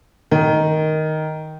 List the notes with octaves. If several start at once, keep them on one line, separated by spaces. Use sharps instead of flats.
D#3